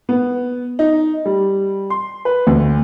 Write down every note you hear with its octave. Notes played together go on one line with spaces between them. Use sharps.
B3
D#4
G3
C6
B4
D2